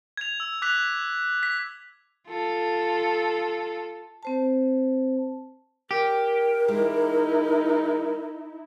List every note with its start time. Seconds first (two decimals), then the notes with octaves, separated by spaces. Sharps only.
0.17 G#6 F7
0.40 E6
0.62 D6 F#6 B6 F7
1.43 B6
2.28 F4 A4
4.23 C4 C5 A5
5.91 G4 A#4
6.68 E3 G#3 D#4 E4